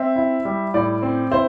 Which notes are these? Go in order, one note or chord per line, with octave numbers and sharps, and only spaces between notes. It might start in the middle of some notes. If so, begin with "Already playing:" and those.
Already playing: C4 E5
E4
G3
A2 D5
C4
E4 C5